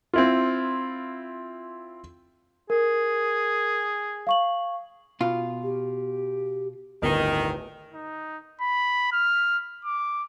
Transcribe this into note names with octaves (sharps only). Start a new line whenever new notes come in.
C4 E4 F4
G#4 A#4
F5 C#6 F#7
B2 F4
G4
D1 G1 D#3
D#4
B5
F6
D6